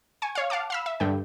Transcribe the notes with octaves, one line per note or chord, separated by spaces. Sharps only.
G#5 C#6
C#5 F5
F5 F#5 A5 D6
F5 B5 E6
E5
G2 D3 G5